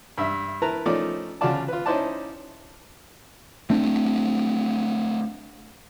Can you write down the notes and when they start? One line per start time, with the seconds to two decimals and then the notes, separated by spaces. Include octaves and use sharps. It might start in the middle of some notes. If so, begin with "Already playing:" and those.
0.18 G2 E5
0.62 E4 A#4 B4 A5 A#5
0.86 F3 A3 C#4 D#4 D5 D6
1.41 D2 C#3 F#3 F4 D5 A5
1.68 F4 B4
1.86 C#4 D#4 E4 C5 D5 A5
3.70 A3 C4 D4